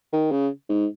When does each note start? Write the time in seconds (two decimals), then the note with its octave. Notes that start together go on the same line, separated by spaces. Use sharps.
0.13 D#3
0.31 C#3
0.69 G#2